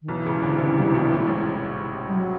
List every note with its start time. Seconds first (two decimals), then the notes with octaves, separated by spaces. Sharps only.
0.02 D#3
0.08 B1 B2 E3
0.26 C#2 C#3
0.43 D2 D3
0.56 C3
0.59 C#2 C#3
0.77 C2 C3
0.94 B1 B2
1.12 A2
1.20 G#2
1.27 A1 A2
2.07 G3
2.14 F#3